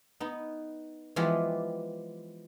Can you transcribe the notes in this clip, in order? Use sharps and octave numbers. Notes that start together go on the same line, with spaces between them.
B3 D#4
E3 F3 G#3 B3 F4 G4